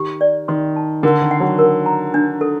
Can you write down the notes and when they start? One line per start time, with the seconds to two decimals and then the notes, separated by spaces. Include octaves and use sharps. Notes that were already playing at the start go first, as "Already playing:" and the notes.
Already playing: D#3 G4
0.21 D5
0.48 D#3 C6
0.76 A5
1.03 D3 A#4
1.22 D#3
1.31 F#5
1.40 F#3
1.58 A#4
1.86 A#5
2.14 D4
2.41 A4